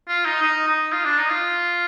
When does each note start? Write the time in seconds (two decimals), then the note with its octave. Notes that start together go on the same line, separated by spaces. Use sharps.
0.08 F4
0.25 D#4
0.42 D#4
0.67 D#4
0.93 F4
1.05 D4
1.18 D#4
1.30 F4